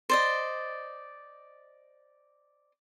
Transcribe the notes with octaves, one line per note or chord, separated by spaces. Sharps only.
C5 D5 D#5